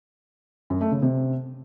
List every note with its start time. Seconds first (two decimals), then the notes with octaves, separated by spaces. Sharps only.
0.70 F#2
0.81 A3
0.91 C#3
1.02 C3